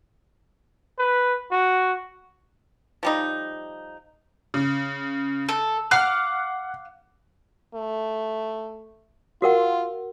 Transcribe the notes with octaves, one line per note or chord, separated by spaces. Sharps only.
B4
F#4
F3 G3 D#4
C#3
A4
F5 F#5 D6 F6 F#6
A3
F4 F#4 A#4 F#5